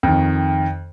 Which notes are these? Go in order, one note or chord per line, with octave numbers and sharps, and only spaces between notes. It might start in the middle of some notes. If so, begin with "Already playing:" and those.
F2 D#3